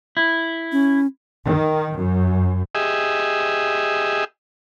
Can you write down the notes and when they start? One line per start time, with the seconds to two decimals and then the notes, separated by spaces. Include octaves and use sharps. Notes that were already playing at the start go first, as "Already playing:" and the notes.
0.17 E4
0.72 C#4
1.45 D#3
1.95 F#2
2.75 G4 G#4 D#5 E5